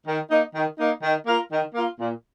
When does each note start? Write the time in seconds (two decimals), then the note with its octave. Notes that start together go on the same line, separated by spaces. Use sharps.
0.06 D#3
0.30 A#3 D#4
0.55 D#3
0.79 A#3 D#4
1.03 D#3
1.26 A#3 F4 A#4
1.50 D#3
1.74 A#3 F4 A#4
1.99 A#2